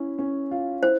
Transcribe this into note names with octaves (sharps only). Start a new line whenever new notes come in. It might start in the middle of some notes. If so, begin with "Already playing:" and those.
Already playing: C#4 E4
C#4
F4
E4 C5